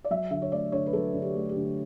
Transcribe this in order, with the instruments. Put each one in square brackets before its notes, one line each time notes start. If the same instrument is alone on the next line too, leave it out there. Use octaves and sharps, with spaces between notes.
[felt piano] D5
F#3 E5
D3 E5
C#5
A3 D5
D3 C#5
B4
F#3 A4
D3
G4
A3
G4
D3